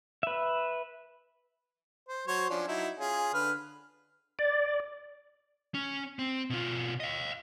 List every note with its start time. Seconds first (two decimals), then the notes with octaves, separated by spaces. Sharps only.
0.23 B4 E5
2.09 C5
2.27 F#3 C5 C#5
2.50 F3 C#4 D4
2.68 F#3 D#4 E4
2.99 C#4 F4 G#4
3.34 D3 B4 F6
4.39 D5
5.75 C#4
6.19 C4
6.50 B2 F4
7.00 D#5 F5